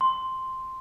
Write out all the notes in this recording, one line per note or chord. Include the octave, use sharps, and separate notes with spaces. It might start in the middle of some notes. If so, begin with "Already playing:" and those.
C6